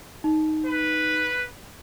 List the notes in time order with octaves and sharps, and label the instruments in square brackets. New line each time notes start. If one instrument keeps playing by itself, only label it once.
[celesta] D#4
[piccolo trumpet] B4